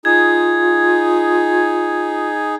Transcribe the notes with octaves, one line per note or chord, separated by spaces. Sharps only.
D#4 F4 G#4 G#6